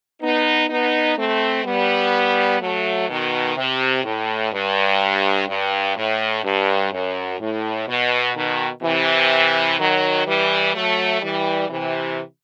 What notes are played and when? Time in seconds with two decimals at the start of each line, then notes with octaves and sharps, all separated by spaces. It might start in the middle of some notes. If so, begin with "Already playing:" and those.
0.22 B3 D#4
0.69 B3 D#4
1.17 A3 C4
1.65 G3 B3
2.61 F#3 A3
3.08 B2 D#3
3.56 C3
4.04 A2
4.52 G2
5.48 G2
5.96 A2
6.43 G2
6.92 F#2
7.40 A2
7.87 B2
8.35 B2 D#3
8.83 C3 E3
9.78 D#3 F#3
10.26 E3 G3
10.74 F#3 A3
11.22 E3 G3
11.70 C3 E3